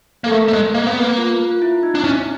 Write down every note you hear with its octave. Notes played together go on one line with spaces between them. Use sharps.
A#3 A4
A3 A#4
A3
G#3
A#3 A#4
B3
A#3 B4
F4
F4
E4
D#4
D4
C#4 E4